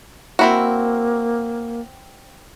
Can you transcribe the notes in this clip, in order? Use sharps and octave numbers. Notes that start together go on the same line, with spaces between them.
A#3 C4 E4 F#4